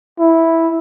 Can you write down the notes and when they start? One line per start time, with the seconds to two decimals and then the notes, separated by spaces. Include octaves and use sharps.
0.19 E4